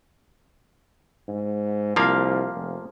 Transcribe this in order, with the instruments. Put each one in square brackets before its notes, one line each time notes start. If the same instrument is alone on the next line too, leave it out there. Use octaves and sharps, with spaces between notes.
[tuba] G#2
[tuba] C2 [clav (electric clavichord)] F3 A#3 F5
[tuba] F1